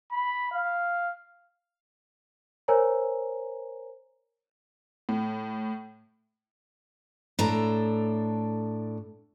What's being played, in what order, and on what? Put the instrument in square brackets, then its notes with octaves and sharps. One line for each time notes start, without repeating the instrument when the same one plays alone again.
[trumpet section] B5
F5
[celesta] A#4 C5 C#5 G#5 A#5
[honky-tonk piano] A2
[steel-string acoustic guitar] A2 D4 A4 A#5